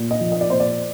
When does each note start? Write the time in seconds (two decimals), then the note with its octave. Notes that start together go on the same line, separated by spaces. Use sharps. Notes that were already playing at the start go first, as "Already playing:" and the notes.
Already playing: A#2
0.11 D#5
0.21 F3
0.32 D#5
0.41 D5
0.50 A#2 C5
0.60 D5